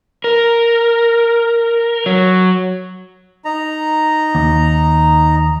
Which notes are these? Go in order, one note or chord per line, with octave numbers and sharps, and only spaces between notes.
A#4
F#3
D#4 A#5
D#2